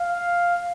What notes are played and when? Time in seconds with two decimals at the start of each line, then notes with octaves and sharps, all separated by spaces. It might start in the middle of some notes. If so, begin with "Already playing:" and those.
Already playing: F5